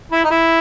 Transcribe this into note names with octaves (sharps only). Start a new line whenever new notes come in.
E4
D#4
E4